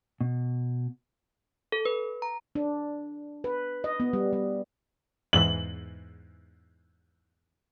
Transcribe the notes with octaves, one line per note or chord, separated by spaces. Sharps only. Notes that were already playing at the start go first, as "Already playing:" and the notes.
B2
A4
B4
A#5
D4
B4
D#5
B3
G3
G3
E2 G#2 E3 F#7